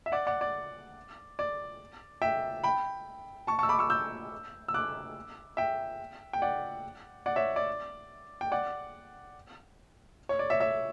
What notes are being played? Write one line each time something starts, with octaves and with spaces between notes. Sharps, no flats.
E5
D5 F#5
D5 F#5
D5
D5
E5 G5
G5 B5
A5 C#6
A5 C#6
E6
B5 D6
C#6 E6
E6 G6
E6
D6 F#6
E5 G5
G5
D5 F#5
D5 F#5
C#5 E5
D5
G5
D5 F#5
C#5
D5
C#5 E5
C#5 E5